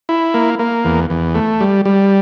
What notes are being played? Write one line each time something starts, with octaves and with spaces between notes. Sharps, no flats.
E4
A#3
A#3
E2
E2
A3
G3
G3